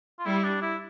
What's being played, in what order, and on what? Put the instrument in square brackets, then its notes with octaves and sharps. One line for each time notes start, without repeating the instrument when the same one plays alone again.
[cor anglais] F4
[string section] G3 [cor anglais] E4
[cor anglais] D4
E4